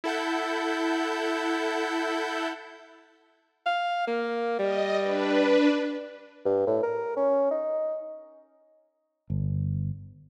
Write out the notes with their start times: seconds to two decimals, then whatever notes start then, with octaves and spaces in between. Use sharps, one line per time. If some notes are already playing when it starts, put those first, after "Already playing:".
0.04 E4 A4 F#5 G6
3.66 F5
4.07 A#3
4.59 G3 D#5
5.01 D4 B4
6.45 G2
6.67 A2
6.83 A#4
7.17 C#4
7.51 D#4
9.30 G1